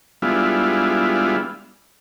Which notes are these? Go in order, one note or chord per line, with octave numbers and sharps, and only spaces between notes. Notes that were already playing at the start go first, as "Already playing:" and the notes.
G3 G#3 B3 D4 E4 F4